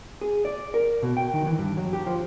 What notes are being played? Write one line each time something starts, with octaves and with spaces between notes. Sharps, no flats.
G#4
D5
A#4
B2
G5
D#3
E3
G2
F#3
G4
F3